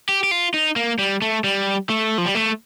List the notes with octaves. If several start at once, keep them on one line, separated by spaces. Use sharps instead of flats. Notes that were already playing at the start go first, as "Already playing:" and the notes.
G4
G4
F4
D#4
A#3
G3
A3
G3
A3
F3
G3
A3